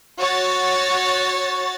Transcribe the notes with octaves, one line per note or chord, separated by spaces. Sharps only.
F#4 C#5 A6